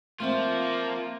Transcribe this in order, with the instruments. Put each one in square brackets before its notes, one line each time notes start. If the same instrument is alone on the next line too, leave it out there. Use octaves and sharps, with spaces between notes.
[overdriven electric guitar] F3 F4 [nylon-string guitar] A3 C4 E5 [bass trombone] A#3